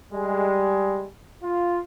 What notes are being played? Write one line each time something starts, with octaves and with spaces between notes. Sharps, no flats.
G3 G#3
F4